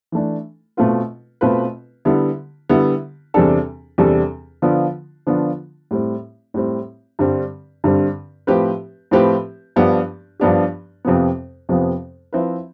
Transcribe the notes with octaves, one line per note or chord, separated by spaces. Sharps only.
E3 A3 D4
B2 A3 C4 F4 B4
B2 A3 C4 F4 B4
D3 G3 B3 E4
D3 G3 B3 E4
E2 C3 G3 D4 A4
E2 C3 G3 D4 A4
D3 F3 B3 D4 F4
D3 F3 B3 D4 F4
A2 G3 C4
A2 G3 C4
G2 D3 G3 C4
G2 D3 G3 C4
A2 F3 C4 G4 B4
A2 F3 C4 G4 B4
G2 F3 B3 D4 G4
G2 F3 B3 D4 G4
F2 C3 F3 B3
F2 C3 F3 B3
F3 C4 E4 B4